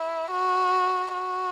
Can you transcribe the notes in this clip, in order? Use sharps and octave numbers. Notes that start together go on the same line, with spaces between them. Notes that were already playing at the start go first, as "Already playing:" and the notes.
Already playing: E4
F#4
F#4